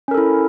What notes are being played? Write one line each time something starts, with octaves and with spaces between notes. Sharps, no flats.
C#4 E4 A4 A#4